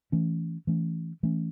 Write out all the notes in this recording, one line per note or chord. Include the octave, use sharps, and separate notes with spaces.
E3 A3 C#4
E3 A3 C#4
E3 A3 C#4